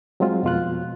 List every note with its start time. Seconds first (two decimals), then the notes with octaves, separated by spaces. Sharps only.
0.20 F#3 G#3 C4 F4
0.43 F2 B2 F4 F#6